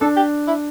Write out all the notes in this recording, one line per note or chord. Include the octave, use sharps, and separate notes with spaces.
D4 A4
G4
E4